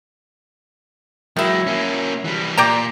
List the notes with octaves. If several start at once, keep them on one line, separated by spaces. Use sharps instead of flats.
D#3 F#3 G#3 E4
A#3 C#4
E3 G3
A#2 G4 D5 A#5